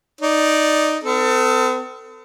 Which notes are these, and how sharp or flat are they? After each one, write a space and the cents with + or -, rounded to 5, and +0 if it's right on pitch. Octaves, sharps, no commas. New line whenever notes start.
D#4 +0 D5 +0
C4 -45 A4 +25